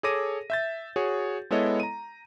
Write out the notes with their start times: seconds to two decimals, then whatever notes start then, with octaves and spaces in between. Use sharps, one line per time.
0.03 G#4 A4 C#5 D6 A#6 D#7
0.50 E5 G6 A6
0.96 F#4 G#4 C#5
1.51 G#3 B3 E4 A4 C#5 D#5
1.80 A#5 D#7